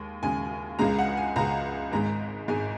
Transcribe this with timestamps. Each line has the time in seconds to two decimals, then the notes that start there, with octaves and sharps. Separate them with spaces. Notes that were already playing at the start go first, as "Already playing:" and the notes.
Already playing: D#2 G#3
0.23 D#2 C#3 G#3 G#5
0.79 C#2 C#3 G#3 A#5
0.98 F#5
1.17 G#5
1.36 C#2 C#3 G#3 A#5
1.92 G#1 G#2 G#3 A#5
2.48 G#1 G#2 G#3 G#5